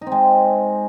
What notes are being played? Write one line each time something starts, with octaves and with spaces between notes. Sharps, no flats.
D#4
C4
G#3